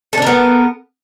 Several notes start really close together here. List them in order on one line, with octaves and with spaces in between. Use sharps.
A4 D4 A#4 B3